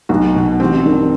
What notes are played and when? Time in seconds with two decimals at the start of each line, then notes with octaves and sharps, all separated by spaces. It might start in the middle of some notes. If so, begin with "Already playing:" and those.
0.09 B1 F#4
0.35 B2
0.60 A1 C4
0.85 G2 D#3